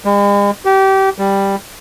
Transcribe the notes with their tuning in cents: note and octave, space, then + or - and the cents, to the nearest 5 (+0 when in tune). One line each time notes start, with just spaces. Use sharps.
G#3 -45
G4 -25
G3 +5